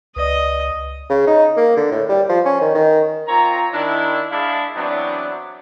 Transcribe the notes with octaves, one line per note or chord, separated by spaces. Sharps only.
C#2 B4 D5 D#5 D#6
C#3
D#4
A#3
D3
A2
G3
F3
C#4
D#3
D#3
C4 F4 C#5 A#5
D#3 D4 E4
G#3 D4 E4 E5 F5
E3 F#3 B3 C4 D4 E4